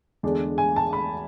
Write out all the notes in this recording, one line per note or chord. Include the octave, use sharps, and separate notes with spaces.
E2 D3 G#3 D4
G#5
A5
B5